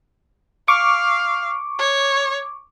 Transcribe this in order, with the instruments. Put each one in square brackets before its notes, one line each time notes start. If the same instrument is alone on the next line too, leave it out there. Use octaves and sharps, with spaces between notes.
[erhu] F5 [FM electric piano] C#6 D6
[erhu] C#5